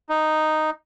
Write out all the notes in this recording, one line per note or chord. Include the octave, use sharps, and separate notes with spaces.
D#4